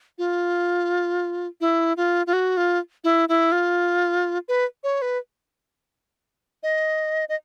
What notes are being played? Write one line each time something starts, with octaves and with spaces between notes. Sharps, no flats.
F4
E4
F4
F4
F#4
F4
E4
E4
F4
B4
C#5
B4
D#5
D#5